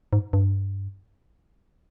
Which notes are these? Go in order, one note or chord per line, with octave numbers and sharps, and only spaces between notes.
G#2
G2